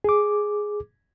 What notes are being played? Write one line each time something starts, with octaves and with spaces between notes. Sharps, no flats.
G#4 D6